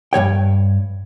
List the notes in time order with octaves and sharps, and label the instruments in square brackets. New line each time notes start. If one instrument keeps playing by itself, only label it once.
[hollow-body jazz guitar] G2 D#3 C#5 G5